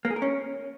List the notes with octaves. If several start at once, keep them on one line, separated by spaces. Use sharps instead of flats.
A#3
G#4
A#4
C#4